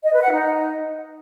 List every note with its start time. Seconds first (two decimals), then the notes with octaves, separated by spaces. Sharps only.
0.03 D#5
0.13 B4
0.22 F#5
0.32 D#4